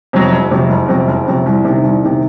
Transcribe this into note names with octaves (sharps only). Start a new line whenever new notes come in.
F2 C3 F#3
F#1
F2 C3 F#3
F#1
F2 C3 F#3
F#1
F2 C3 F#3
C2
C3 D#3
C2
C3 D#3